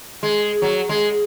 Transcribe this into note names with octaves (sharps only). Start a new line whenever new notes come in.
G#3
F#3
G#3